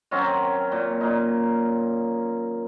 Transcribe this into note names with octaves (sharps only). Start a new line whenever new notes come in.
D#3 F#3 C4 C#4
A#2
A#2 D#4